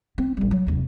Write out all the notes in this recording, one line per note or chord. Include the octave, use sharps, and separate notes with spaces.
C4
A1 G3
F#3
F1 D#2